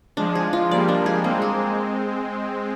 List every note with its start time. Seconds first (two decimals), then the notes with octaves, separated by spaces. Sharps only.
0.17 F3 G#3 D4
0.35 G#4
0.53 F4
0.71 G3 A#3 D5
0.88 D4
1.06 G#4
1.24 G#3 A#3 C4
1.42 G#4